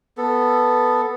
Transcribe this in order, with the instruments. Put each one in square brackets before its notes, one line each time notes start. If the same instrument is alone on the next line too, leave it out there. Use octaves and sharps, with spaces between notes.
[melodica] B3 A4